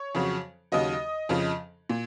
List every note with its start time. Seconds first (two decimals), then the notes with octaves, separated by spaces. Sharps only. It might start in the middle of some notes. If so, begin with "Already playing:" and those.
Already playing: C#5
0.15 F2 C#3 F#3
0.72 D#2 C#3 F#3 D#5
1.29 F2 C#3 F3
1.89 A#2